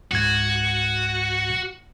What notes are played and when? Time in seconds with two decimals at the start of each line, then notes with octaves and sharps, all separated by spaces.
0.11 C#2 G#2 F#4 G#6